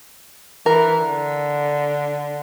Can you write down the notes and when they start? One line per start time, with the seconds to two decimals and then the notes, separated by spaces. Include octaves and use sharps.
0.66 E3 A#4
1.02 D3